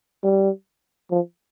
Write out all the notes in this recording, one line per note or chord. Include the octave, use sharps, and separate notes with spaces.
G3
F3